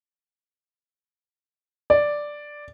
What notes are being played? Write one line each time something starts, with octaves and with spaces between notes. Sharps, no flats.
D5